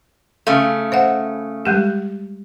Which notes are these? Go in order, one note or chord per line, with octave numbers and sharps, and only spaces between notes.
C#3 A3 F5
C5 E5 F#5
G3 G#3 G4